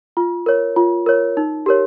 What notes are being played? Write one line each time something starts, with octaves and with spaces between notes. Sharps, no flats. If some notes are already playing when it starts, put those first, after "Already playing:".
F4
A#4 C#5
F4
A#4 C#5
D#4
G4 A#4 C#5